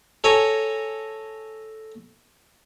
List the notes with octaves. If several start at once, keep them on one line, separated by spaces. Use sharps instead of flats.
A4 C#5 G#5 A#5 C#6